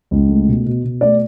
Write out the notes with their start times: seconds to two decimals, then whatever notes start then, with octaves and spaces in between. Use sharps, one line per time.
0.11 C#2
0.29 A3
0.47 B2
0.66 B2
0.84 B2
1.01 A3 D5